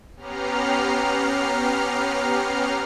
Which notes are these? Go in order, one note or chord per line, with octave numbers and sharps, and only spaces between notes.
B3 C#4 G4 A#5 F6 C7